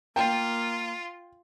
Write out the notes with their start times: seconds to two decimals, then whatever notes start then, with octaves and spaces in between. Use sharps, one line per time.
0.16 A#3 F4 G5